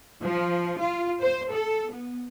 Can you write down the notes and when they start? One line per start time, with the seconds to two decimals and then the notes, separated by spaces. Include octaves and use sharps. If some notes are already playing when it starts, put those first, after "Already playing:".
0.21 F3
0.80 F4
1.21 C5
1.52 A4
1.89 B3